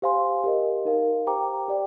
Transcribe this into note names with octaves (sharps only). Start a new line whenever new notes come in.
G4 C5 F5 G#5 C6
G4 A#4 D#5
D#4 A#4 F5
G4 C5 G5 A#5 D6
G4 D5 G5